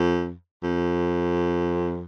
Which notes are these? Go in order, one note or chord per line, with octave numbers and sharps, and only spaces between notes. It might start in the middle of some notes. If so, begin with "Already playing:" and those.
Already playing: F2
F2